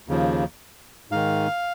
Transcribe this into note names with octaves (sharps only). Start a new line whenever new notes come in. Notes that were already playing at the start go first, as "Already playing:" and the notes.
D#2 C#3 F3
G#2 D#3 F5